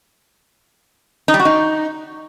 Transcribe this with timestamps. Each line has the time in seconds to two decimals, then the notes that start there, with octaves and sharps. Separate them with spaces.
1.28 D#4
1.34 G3
1.40 F#4
1.45 D#4